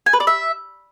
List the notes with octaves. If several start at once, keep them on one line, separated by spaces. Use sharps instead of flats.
G#5
B4
D5
E5